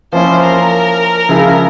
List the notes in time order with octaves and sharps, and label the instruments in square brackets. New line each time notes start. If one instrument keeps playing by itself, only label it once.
[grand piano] F3 A#3 C#4 E4 [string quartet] C5
[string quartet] A#4
[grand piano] C#3 F3 G#3 E4